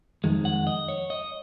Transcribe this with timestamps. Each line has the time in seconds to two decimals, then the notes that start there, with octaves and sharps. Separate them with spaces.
0.24 F2 D#3 G#3
0.45 F#5
0.67 D#5
0.88 C#5
1.10 D#5